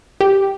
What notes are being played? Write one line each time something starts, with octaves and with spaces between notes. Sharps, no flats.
G4